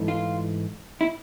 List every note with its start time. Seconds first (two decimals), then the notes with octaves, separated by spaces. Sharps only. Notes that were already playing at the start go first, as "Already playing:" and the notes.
Already playing: G#2 E3 A3
0.08 F4
1.01 E4